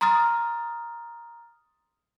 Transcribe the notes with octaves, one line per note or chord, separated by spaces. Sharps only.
A#5 C6 D#6 F6 A6